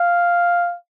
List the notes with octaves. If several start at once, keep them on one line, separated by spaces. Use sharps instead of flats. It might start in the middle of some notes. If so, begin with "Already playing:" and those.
Already playing: F5